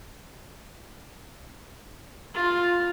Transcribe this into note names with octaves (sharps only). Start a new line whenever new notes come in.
F4